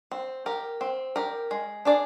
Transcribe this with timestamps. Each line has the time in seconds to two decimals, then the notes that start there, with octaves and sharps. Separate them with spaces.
0.11 C4
0.46 G4 A#4
0.81 C4
1.16 G4 A#4
1.51 G#3
1.85 D4 G#4 D5